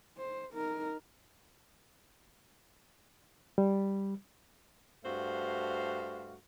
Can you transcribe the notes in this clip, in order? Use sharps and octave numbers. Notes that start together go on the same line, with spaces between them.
C5
D#4 A#4
G3
G2 A3 F#4 C5 F5